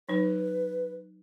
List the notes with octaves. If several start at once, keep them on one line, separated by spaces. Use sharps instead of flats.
F#3 D#4 B4